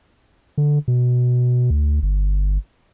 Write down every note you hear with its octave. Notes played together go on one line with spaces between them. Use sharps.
D3
B2
D2
G1